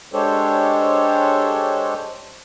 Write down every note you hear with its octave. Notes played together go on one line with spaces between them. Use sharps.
G#3 D4 G4 A4 C5 C#5